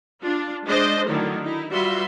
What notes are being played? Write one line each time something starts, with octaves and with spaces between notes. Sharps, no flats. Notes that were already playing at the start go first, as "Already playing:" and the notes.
D4 F4
G#3 D4 C5 D#5
D3 D#3 F#3 A3 E4
D#4 E4
G3 F4 F#4 B4 E5 C6